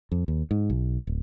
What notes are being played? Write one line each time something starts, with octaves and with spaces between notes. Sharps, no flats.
F2
D#2
G#2
B1
D1